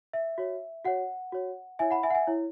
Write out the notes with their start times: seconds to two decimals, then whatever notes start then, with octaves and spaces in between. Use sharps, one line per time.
0.13 E5
0.38 F#4 C#5
0.85 F#4 C#5 F#5
1.32 F#4 C#5
1.79 E4 C#5 E5 G#5
1.91 F#5 B5
2.03 E5 G#5
2.10 F#5
2.15 E5 G#5
2.27 E4 C#5